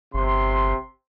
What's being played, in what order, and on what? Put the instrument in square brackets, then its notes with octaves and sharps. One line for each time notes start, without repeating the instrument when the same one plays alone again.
[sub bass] G1 [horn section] C3 C6